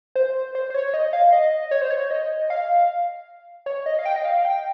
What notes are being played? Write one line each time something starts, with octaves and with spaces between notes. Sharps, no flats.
C5
C5
C5
C#5
D#5
F5
D#5
C#5
C5
C#5
D#5
F5
C#5
D#5
F5
G5
D#5
F5
G5